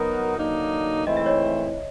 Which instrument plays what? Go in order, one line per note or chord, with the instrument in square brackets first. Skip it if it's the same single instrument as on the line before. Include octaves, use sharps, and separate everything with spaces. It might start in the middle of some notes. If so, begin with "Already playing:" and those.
Already playing: [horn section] F#3 B3 D#4 F#4 A#4
D3 F#3 A#3 D#4
[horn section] G#2 E3 A3 C4 E4 [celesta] D#5
[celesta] E5
C#5 D#5